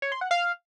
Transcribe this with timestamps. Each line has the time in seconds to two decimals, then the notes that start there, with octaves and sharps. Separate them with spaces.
0.02 C#5
0.12 C6
0.21 F#5
0.31 F5